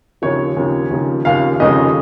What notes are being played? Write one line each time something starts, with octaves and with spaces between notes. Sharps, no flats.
D#2 C#3 F3 C#5
D#2 C#3 F3
D#2 C#3 F3
D#2 C#3 F3 F5
F1 D#2 C#3 F3 G#3 D#5